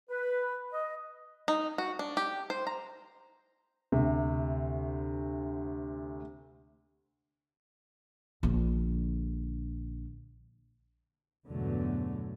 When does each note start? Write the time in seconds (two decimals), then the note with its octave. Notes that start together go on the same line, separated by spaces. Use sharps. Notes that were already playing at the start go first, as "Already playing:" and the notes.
0.10 B4
0.72 D#5
1.48 D#4
1.78 F#4
1.99 D4
2.17 G4
2.50 C5
2.67 A#5
3.92 D2 C3
8.43 A#1 D3
11.47 E2 G2 B2 D3 F#3 A3